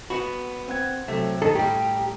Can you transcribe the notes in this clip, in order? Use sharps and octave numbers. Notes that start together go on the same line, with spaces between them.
B3 F#4 B5 C#7
C4 F#5 G#6
C3 F#3 A3
D#3 A4 A#5 D#6
A2 G3 G4